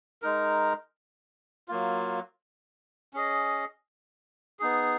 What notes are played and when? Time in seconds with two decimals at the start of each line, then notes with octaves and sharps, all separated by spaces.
0.22 G#3 D#4 A#4
1.68 F#3 A#3 F4
3.14 C#4 G#4 D#5
4.60 B3 D#4 G#4